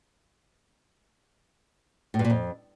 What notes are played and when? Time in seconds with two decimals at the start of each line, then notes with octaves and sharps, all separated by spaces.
2.14 A2
2.19 G2
2.25 A#2
2.30 F2